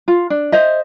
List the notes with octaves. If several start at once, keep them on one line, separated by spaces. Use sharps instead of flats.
F4
D4
C5 D#5 E5